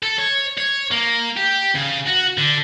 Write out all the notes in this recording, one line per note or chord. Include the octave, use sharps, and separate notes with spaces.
A4
C#5
C#5
A#3
G4
C#3
F#4
D3